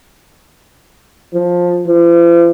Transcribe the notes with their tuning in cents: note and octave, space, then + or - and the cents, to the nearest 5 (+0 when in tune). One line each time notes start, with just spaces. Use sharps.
F3 +15
F3 -45